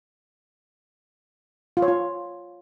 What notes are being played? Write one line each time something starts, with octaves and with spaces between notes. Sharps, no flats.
F4
C#5
F4